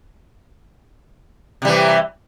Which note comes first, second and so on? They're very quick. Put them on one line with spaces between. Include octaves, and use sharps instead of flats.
C3 G3 E3